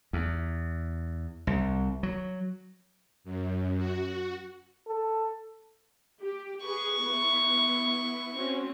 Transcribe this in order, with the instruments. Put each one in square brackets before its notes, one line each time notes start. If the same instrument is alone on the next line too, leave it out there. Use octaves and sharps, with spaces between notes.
[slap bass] E2
C2
F#3
[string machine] F#2
F#4
[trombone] A4
[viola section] G4
[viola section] G#4 B4 [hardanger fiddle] C#6
[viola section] B3 E4
C4 C#4 F#4